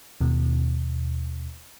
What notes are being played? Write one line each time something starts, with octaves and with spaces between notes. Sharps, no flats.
D#2 B2